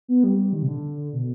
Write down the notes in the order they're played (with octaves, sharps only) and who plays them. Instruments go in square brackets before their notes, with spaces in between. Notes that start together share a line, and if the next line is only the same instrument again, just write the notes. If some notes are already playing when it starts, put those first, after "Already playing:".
[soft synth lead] B3
G3
D#3
C3
D3
B2